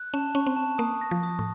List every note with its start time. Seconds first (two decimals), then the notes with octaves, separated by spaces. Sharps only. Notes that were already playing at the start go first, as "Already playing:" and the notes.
Already playing: F#6
0.14 C#4 A5
0.35 C#4 C#6
0.46 C4
0.56 A5
0.78 A#3 D#6
1.01 A#6
1.11 F3
1.23 D#6
1.39 A2